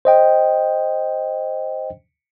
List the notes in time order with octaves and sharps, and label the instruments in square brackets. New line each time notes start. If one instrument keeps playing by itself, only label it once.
[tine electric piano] C5 D#5 G5